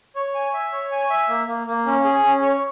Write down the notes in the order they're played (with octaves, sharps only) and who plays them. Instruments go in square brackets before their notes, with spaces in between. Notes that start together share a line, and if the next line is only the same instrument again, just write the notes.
[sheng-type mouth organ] C#5
G#5
E5
C#5
G#5
E5
A#3
A#3
A#3
C#4
G#4
C#4
C#5